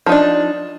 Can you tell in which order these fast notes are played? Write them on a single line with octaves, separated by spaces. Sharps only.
F3 D#4 D4